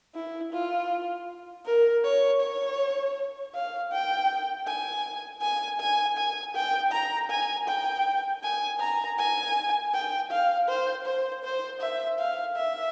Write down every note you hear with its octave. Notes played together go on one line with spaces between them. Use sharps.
E4
F4
A#4
C#5
C#5
F5
G5
G#5
G#5
G#5
G#5
G5
A#5
G#5
G5
G#5
A#5
G#5
G5
F5
C5
C5
C5
E5
F5
E5